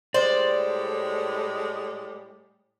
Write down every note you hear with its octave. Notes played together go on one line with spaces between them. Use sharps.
A2 G3 G#3 C5 D5